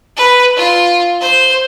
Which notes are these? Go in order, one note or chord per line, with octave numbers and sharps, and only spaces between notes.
B4
F4
C5